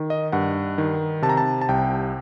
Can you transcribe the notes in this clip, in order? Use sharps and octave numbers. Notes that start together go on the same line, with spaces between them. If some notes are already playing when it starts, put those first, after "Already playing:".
Already playing: D#3
D#5
G2 F#5
D#3
C3 A5
A#5
A5
A5
C2 G5